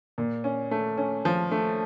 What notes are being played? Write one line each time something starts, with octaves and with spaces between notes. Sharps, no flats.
A#2
C#4
A3
C#4
F3
A3